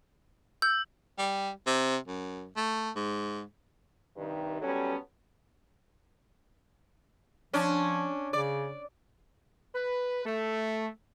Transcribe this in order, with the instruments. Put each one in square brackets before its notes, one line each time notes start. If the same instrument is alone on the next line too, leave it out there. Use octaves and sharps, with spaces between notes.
[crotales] E6 [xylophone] G6
[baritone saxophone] G3
C3
F#2
A3
G#2
[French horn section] G2 C3 D#3
F#3 G3 B3 C#4 A4
[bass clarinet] F3 [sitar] C#4 D4
[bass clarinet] C#3 [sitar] D5
[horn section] B4
A3